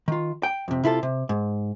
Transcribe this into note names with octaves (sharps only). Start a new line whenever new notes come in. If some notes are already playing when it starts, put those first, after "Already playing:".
D#3 F4
G5
F2 C3
C3 E4 F4 A4
C3
G#2